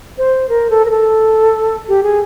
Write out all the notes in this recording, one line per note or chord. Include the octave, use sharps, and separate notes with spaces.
C5
A#4
A4
A#4
A4
G4
G#4